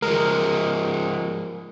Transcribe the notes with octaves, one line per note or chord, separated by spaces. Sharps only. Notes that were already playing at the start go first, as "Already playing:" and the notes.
F3 G#3 A#4